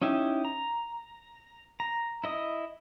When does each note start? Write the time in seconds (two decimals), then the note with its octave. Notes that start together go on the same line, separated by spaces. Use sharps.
0.02 C#4 D#4 E4 G4
0.45 A#5
1.80 A#5
2.24 E4 D#5 D#6